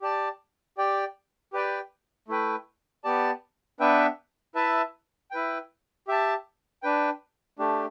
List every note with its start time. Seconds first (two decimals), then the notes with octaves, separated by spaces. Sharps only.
0.02 G4 D5 A5
0.78 G4 D5 G5
1.53 G4 B4 D5 G5
2.28 A3 E4 B4 G5
3.04 B3 G4 D5 A5
3.80 B3 D4 B4 E5 G5
4.55 E4 B4 E5 A5
5.31 E4 B4 G5
6.08 G4 E5 A5
6.83 D4 B4 G5
7.59 A3 D4 G4